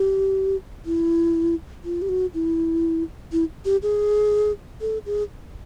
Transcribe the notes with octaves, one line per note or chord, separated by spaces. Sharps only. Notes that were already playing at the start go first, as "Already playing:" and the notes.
Already playing: G4
E4
F4
G4
F#4
E4
E4
G4
G#4
A4
G#4